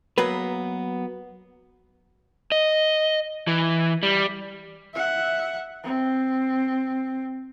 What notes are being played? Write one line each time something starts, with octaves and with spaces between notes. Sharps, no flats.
F#3 A#3 B3 B4
D#5
E3
G3
E5 F#5
C4